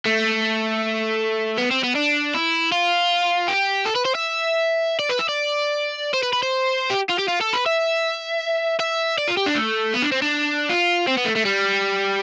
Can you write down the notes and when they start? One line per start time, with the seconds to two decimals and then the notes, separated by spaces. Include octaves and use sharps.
0.06 A3
1.58 B3
1.71 C4
1.84 B3
1.95 D4
2.34 E4
2.72 F4
3.48 G4
3.85 A4
3.95 B4
4.05 C5
4.15 E5
4.99 D5
5.09 B4
5.19 E5
5.29 D5
6.14 C5
6.23 B4
6.33 B4
6.43 C5
6.90 G4
7.09 F4
7.18 G4
7.28 F4
7.41 A4
7.53 B4
7.66 E5
8.80 E5
9.18 D5
9.28 F4
9.37 G4
9.46 D4
9.55 A3
9.94 B3
10.03 D4
10.12 C4
10.22 D4
10.69 F4
11.08 C4
11.18 B3
11.26 A3
11.36 A3
11.45 G3